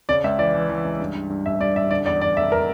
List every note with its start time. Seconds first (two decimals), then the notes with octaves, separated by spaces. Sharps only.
0.09 C#3 D5
0.24 C#2 E5
0.39 E3 D5
0.54 E3
0.69 E3
0.85 C#2
1.00 G2
1.15 G2
1.30 G2
1.45 A1 E5
1.60 G2 D5
1.76 A1 E5
1.91 D3 D5
2.06 E2 D5
2.21 E2 D5
2.36 F1 E5
2.52 A#4